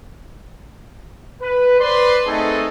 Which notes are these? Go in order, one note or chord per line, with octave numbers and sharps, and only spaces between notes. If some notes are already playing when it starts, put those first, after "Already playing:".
B4
B4 C5 D5 C6
A3 C4 D#4 G#4 A4